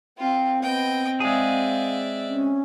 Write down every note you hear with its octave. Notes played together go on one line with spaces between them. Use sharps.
C4 F4 G5
B3 D#5 G5
G#3 G#4 D5 E5 F5
C#4